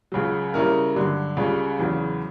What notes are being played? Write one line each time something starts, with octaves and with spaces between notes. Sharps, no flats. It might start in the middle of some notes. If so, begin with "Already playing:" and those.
C#2 C#3 F#3
C#3 G3 C#4 E4 A#4
G2 D3 F#3
C#2 C#3 G3 C#4
E2 C#3 F#3